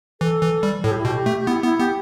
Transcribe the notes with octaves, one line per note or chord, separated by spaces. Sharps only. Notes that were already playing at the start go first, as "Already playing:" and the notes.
E3 A4
E3
G3
A2 A4
G4
E4
B2 G4
A3
G4
B3 E4
B3 E4
B3 G4